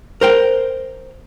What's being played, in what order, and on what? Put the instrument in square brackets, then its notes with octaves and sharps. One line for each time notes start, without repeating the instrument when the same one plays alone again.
[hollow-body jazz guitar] A#4 C5 G5